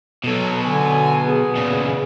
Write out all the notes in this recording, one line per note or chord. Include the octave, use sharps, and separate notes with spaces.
B2 F#3 A4
D3 G#5
B3 G#4
A#2 C#3